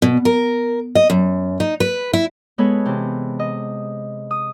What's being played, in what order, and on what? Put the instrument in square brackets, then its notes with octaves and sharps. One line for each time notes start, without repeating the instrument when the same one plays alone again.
[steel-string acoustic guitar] B2
A#4
D#5
F#2
D#4
B4
E4
[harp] G#3 B3 G#4 A4 B4 C#5
C3 E3
D#5
D#6